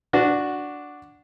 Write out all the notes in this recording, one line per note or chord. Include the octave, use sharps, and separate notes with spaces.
D4 F#4